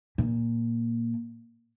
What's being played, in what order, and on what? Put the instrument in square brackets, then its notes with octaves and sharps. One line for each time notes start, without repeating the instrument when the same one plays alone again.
[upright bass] A#2